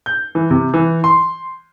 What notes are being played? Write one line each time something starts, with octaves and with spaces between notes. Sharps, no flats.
G6
E3
C3
E3
C6